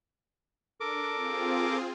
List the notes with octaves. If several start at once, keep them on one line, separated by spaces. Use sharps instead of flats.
D4 A4 A#4 D6
C4 F4 G#4